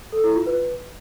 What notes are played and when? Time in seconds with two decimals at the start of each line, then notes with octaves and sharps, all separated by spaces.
0.12 A4
0.24 E4
0.35 F4
0.46 B4